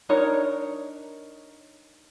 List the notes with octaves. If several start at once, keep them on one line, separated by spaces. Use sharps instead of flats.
D4 D#4 A#4 C#5